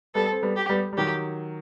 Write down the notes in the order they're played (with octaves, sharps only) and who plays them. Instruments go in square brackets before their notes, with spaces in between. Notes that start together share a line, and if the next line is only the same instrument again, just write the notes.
[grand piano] G3 B3 [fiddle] A4
[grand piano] C4
G3 B3
[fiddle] G4
[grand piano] G3 B3
G3
[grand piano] D#3 F#3 [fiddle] G4